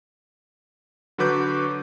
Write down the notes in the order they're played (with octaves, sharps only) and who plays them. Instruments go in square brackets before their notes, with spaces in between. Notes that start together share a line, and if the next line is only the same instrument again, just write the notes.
[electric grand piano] D3 F#3 F#4 B4 D6 G6